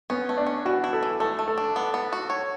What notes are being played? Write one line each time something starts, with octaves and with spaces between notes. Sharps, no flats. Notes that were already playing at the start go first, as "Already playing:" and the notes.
B3 C#4
A3
D4
C#4
E3 F#4
E4
A4
E3
A3 A4
A3
A4
D4
B3
B3
F#4
C#5